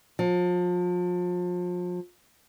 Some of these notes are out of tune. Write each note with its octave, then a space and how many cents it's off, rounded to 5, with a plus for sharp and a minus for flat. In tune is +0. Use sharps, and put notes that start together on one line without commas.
F3 +35